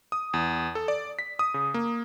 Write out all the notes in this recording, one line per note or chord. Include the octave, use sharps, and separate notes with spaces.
D#6
E2
A4
D5
B6
D#6
C#3
A#3